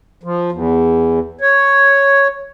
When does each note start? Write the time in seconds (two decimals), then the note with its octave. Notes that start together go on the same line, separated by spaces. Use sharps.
0.23 F3
0.52 E2
1.41 C#5